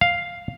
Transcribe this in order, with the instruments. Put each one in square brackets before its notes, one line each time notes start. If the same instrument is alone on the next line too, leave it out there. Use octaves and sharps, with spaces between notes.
[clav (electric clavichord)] F5